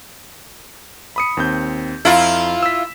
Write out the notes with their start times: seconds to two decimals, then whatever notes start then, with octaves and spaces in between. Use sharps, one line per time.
1.16 B5 D#6 C#7
1.37 D#2 C4 G6
2.05 F2 E4 F4 A#5
2.63 E6 B6